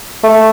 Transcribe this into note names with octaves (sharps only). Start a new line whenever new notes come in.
A3